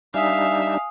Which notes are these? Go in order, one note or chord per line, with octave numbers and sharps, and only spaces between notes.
G3 D4 D#4 E5 F5 G#5 D#6